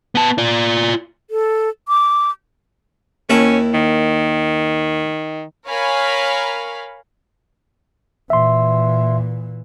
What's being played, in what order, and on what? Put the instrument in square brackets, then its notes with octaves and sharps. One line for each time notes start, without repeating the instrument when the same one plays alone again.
[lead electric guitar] B3 A5
F4 D5
[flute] A4
D6
[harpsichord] D#2 E4 A5 [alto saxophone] C#4
[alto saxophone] D#3
[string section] A#4 C#5 F5 G#5 B5
[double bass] A#2 E3 [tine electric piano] E5 C6